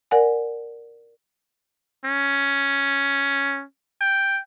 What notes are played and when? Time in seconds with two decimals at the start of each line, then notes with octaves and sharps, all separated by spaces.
0.11 A#4 D5 F#5 G#5
2.05 C#4
4.01 G5